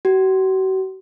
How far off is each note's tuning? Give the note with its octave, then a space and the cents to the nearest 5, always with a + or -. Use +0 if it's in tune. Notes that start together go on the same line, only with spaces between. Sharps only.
F#4 +40